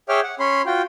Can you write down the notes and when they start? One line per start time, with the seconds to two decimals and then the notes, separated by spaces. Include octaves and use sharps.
0.09 G#4 C#5 E5 G5 D6 F6
0.23 F#5
0.40 C#4 C#5 B5 C6
0.66 F4 F#4 G5